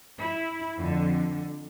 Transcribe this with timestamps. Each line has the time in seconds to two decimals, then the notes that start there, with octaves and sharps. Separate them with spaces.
0.18 E4
0.77 F2 D3